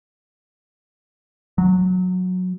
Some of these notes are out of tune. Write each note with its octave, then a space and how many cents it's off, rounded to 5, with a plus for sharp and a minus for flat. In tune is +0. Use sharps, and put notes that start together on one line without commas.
F#3 -15